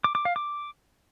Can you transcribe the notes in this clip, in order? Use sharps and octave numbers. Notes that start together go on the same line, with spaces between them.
D6
D6
F5
D6